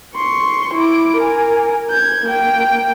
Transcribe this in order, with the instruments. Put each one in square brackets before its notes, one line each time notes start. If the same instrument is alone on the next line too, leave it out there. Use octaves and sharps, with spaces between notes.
[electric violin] C6 C#6
E4 D6
A#4 G#5
G6 G#6
A#3 G5